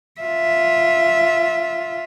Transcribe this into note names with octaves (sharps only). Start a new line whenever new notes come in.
F4 E5